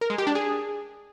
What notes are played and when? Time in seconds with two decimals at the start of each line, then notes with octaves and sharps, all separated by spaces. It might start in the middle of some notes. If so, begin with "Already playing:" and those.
0.01 A#4
0.10 G#3
0.18 G4
0.27 D4
0.35 G#4